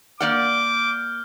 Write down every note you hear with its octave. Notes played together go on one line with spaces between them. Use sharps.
A#3 D5 F#5 D6 F6 G6